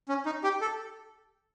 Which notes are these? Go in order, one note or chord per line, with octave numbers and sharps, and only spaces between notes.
C#4
D#4
G4
A4